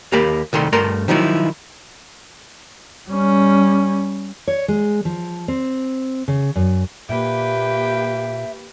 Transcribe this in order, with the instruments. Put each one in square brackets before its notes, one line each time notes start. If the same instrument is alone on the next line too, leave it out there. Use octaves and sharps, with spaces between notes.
[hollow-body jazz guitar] D#2 A#3 G4 B5
C2 D#3 A3 C6
G2 A3 A#4 A#5 C6
D#3 F3 F#3 D#4 E4
[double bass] G3 C#4
[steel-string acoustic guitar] C#5
G#3
F3
C4
C#3
F#2
[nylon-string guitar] A#2 [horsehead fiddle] A#3 G4 [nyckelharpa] B4 G5 [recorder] E5